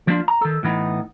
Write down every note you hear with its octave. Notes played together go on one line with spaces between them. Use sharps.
F3 A#3 D4 F4
A#5
D#3 A4
A2 E3 B3 D#4